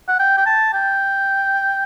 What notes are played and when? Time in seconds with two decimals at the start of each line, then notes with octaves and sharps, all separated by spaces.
0.08 F#5
0.19 G5
0.38 G5
0.46 A5
0.73 G5